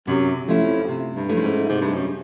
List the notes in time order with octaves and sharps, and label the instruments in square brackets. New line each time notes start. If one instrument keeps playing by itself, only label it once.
[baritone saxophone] F#2 [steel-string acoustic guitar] C3
[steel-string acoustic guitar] F3 A3 C#4 E4
[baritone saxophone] F2
[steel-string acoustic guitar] C3
[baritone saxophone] G2
[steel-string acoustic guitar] F3 A3 C#4 E4
[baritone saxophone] G2
G#2
[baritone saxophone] G#2 [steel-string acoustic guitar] C3
[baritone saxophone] G2
F#2